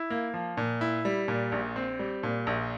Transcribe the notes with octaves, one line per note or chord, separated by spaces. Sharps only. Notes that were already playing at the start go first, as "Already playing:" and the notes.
Already playing: E4
A#3
F3
A#2
E4
G3
A#2
A#1
C4
G3
A#2
A#1